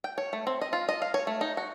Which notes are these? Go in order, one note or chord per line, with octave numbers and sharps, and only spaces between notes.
G5
C#5
A3
C4
D#5
F4
D#5
F5
C#5
A3
D#4
F#4